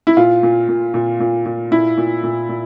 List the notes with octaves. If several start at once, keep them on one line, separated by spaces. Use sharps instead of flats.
E4
A#2 F4
A#2
A#2
A#2
A#2
A#2
A#2 E4
A#2
A#2
A#2